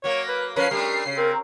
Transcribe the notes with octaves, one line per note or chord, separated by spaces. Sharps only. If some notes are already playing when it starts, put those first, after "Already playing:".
F#3 A#3 C#5
B4
F3 C#4 A#4 B4 C7
G3 A3 D4 A#4
C#3
C4 A#4